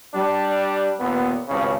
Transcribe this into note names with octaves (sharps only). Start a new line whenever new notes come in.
G3 D4
D#2 A#2 B3
G#1 C#2 G2 C#3